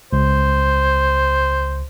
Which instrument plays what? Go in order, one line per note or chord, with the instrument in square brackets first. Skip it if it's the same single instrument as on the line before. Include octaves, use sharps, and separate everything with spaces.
[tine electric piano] C#2 [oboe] C5